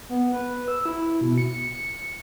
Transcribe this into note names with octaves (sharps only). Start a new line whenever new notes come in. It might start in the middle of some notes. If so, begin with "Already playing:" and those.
B3
B4
E6
E4
B2
C#7